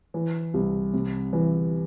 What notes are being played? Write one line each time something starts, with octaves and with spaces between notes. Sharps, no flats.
E3
C2
C3
E3